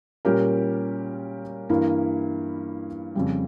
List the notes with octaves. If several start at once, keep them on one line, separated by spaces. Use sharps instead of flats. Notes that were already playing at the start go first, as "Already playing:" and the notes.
A#2 G3 C#4 G4 A#4
G2 E3 A#3 E4
F2 C#3 G3